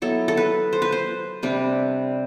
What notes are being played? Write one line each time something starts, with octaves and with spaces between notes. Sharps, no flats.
F#3 B3 E4 A4
A4
B4
C5
B4
C5
C3 G3 D4 B4